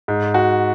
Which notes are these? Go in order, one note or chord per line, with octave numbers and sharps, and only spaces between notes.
G#2
F#4